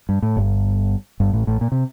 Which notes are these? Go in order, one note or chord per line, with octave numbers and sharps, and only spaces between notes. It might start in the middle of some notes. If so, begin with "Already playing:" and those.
G2
A2
G1 G2
G1 G2
A1 A2
A1 A2
A#2
C3